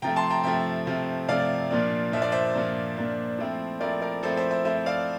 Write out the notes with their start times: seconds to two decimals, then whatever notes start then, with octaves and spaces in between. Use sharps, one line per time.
0.02 C3 F3 A3 G5 A#5
0.16 A5 C6
0.30 G5 A#5
0.44 C3 F3 A3 E5 G5
0.87 C3 F3 A3
1.28 C3 F3 A3 D5 F5
1.71 A#2 F3 A#3 D4
2.12 A#2 F3 A#3 D4 E5
2.22 D5
2.32 C5 E5
2.55 A#2 F3 A#3 D4
2.97 A#2 F3 A#3 D4
3.38 F3 A3 C4 E4
3.80 F3 A3 C4 E4 A#4 D5
4.02 A#4 D5
4.23 F3 A3 C4 E4 A4 C5
4.37 C5 E5
4.51 C5 E5
4.65 F3 A3 C4 E4 C5 E5
4.86 D5 F5